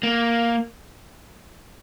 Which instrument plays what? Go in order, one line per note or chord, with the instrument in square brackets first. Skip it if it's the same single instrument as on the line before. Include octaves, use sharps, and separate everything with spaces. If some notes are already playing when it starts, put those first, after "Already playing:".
[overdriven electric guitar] A#3